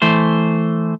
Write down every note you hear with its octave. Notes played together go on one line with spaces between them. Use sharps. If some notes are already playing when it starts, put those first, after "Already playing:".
E3 A3 C5